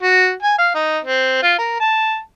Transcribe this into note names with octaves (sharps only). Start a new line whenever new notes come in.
F#4
G#5
F5
D#4
C4
F4
A#4
A5